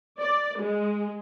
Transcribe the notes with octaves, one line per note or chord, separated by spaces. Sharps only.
D5
G#3